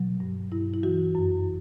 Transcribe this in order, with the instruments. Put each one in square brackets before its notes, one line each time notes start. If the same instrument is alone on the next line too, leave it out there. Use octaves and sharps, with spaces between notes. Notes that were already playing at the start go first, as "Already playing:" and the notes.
Already playing: [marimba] B2 F#3
G2
G2 E4
E4
E3 F#4
F#2